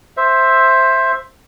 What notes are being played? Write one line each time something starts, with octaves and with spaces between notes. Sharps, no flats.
C5 E5